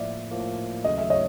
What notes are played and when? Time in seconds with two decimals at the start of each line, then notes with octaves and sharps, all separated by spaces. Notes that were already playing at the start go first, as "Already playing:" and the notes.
Already playing: A2 F3 A#3 D5 E5
0.31 A2 F3 A#3
0.85 D#2 C#3 F#3 A3 C#4 D#5
0.98 E5
1.10 C#5 D#5